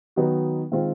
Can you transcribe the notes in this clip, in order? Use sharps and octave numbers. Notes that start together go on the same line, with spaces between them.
D#3 F#3 B3 D#4 F#4
D#3 G#3 C4 F4